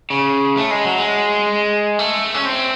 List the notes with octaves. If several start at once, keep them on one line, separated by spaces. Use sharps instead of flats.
C#3
A3
G#3
F#3
G#3
A3
C#4
C4